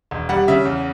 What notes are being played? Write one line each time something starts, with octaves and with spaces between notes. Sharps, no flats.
E1
G3 F#5
C#3 E5
E2